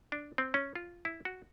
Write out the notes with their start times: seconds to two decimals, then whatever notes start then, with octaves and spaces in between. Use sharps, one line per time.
0.12 D4
0.38 C4
0.54 C#4
0.75 F4
1.05 E4
1.25 F#4